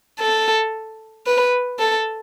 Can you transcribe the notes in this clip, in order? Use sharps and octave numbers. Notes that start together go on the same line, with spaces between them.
A4
B4
A4